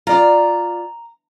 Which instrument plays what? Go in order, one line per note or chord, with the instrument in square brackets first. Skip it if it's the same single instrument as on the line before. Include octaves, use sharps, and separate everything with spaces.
[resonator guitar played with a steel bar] F4 D5 [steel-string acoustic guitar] A#5